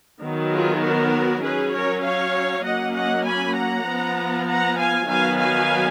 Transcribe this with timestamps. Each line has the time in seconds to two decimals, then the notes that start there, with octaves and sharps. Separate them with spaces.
0.21 D#3 F#3 B3
0.52 F4 G#4
0.83 F#4 A#4
1.43 F#3 C#4 G#4 B4
1.74 A#4 C#5
2.04 C#5 F5
2.64 F#3 A#3 C#4 D#5 F#5
2.95 D#5 F#5
3.25 G#5 B5
3.56 F#5 A#5
3.87 F3 B3
4.47 F#5 A#5
4.78 F5 G#5
5.07 D#3 F#3 B3 F5 G#5
5.38 F5 G#5